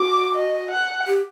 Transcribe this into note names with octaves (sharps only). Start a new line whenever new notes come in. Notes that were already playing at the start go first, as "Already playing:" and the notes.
Already playing: F#4 D6
D#5
F#5
G4